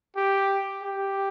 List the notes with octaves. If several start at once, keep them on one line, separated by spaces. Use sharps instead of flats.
G4
G4